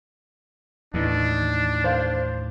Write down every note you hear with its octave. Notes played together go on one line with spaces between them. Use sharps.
D#2 A2 E3 D4 D#4
C5 F5